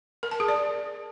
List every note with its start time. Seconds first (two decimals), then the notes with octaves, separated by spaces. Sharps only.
0.23 A#4
0.31 A5
0.40 G#4
0.48 D5